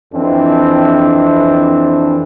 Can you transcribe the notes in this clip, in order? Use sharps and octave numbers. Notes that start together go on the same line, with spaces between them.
F2 E3 C4 D4